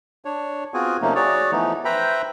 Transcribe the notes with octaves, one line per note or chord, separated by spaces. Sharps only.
D4 C#5
B3 C4 F4 F#4 G#4 G#5
C3 F3 A3 A#3 C#4 D#4
F#4 G#4 C#5 D5
E3 F3 A3 B3 D#4
B4 C5 E5 G5 A#5 B5